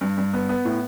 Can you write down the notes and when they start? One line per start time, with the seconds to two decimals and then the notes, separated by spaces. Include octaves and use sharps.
0.01 G2
0.17 G2
0.33 B3
0.49 B3
0.65 A2